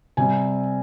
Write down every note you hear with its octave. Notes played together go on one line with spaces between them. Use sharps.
C3 G3 C4 G#5